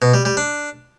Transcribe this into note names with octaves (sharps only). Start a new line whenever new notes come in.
B2
G3
G3
D4